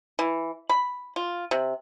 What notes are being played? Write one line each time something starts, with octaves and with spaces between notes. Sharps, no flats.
E3
B5
F4
C3